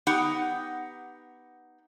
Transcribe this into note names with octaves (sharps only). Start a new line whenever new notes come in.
B3 D#4 G4 F#5